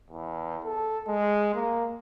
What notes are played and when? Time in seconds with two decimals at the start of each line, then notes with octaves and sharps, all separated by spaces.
0.10 E2
0.64 A4
1.08 G#3
1.54 A#3